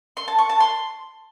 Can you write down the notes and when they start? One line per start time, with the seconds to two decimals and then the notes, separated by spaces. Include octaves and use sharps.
0.17 C6
0.28 A5
0.39 C#6
0.49 A5
0.60 C6